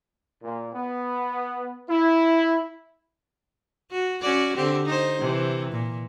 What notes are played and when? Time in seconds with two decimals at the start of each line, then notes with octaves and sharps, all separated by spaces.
0.43 A#2
0.73 B3
1.89 E4
3.91 F#4
4.22 C#4 F#4 D5
4.56 D3 C4 G4
4.86 D#4 C5
5.20 C3 E3
5.72 A#2